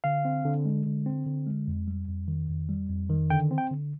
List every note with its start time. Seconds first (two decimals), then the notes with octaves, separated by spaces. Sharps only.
0.04 D3 F5
0.25 C4
0.45 D3
0.65 G#3
0.86 D3
1.06 C4
1.26 D3
1.47 G#3
1.68 F2
1.88 G3
2.08 F2
2.28 D#3
2.49 F2
2.69 G3
2.89 F2
3.10 D#3
3.30 D3 G5
3.51 C4
3.58 G5
3.71 D3